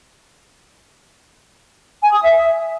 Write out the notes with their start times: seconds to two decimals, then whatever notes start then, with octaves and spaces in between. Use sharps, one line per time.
2.02 G#5
2.12 D#6
2.23 E5